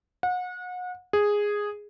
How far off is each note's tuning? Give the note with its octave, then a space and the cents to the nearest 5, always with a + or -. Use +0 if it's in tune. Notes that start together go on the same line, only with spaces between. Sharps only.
F#5 -35
G#4 -5